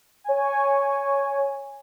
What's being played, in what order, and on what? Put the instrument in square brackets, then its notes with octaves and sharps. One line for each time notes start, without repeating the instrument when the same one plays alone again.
[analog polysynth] C#5 G#5